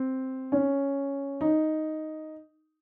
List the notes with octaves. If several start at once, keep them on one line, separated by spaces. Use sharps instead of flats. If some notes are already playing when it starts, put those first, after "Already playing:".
Already playing: C4
C#4
D#4